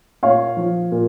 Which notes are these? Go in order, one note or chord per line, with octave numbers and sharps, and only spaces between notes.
A#2 C#5 F5
F3
A#2